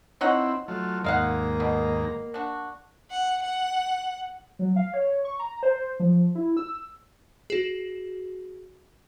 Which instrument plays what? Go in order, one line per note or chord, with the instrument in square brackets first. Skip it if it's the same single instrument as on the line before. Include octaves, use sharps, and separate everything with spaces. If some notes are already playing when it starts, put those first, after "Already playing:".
[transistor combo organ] C4 E4 [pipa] D#4 C#5 F#5
[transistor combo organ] F#3 A3 F4
[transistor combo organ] D#2 G#2 A#5 [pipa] G#3 F5 F#5 [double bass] A#3
[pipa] B2
D4 F#4
[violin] F#5
F#5
[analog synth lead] F#3
F5
C#5
C#6
A#5
C5
F3
E4
E6
[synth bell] F#4 G#4